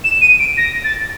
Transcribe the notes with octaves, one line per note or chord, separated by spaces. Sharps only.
E7
D#7
D7
A#6
A6